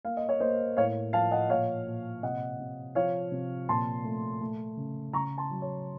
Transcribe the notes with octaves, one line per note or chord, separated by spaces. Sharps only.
A#3 F5
D#5
C#5
A#3 C5 D#5
A2 C#5 F5
F3 F5 A5
D#5 F#5
A#2 C#5 F5
A#2
C3 D#5 F#5
C3
F3 C#5 F5
C3
A#2 A5 C6
A3
A3
C#3
C#3 A#5 C#6
A5 C6
F#3
C#5